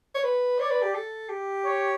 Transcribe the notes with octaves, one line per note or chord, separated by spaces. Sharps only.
C#5
B4
C#5 D5
B4
G4
A4
G4
C#5